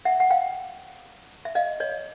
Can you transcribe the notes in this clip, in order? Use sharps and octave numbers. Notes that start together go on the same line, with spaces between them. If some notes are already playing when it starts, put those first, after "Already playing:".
E5 F#5
F#5
F5 G5
E5
D#5 F5
C#5 D#5